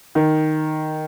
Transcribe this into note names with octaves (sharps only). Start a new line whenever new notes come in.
D#3